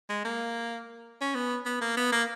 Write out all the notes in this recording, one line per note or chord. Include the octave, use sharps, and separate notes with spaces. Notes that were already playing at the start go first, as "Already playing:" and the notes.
G#3
A#3
C#4
B3
B3
A#3
B3
A#3